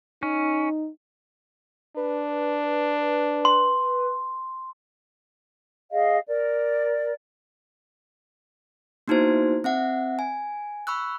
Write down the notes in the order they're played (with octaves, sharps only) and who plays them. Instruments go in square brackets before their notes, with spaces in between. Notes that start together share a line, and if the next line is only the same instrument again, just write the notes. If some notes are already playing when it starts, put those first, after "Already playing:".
[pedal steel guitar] C#4 [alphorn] D#4
[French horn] D4 [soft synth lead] B4
[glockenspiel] C6
[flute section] G#4 D#5 F5
A#4 D5
[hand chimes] A#3 B3 D#4 E4 F#4 C5
C4 E5 F#5
G#5
B5 C#6 E6 F#6